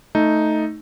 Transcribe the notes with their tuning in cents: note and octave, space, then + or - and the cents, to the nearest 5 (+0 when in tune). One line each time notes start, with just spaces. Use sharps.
A3 +0 D#4 +0